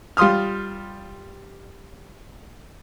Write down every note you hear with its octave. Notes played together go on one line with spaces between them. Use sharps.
G3 F4 C6 D#6 F6